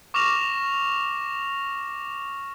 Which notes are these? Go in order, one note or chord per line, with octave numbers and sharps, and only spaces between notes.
C#6 D6 F6 A#6 E7 F7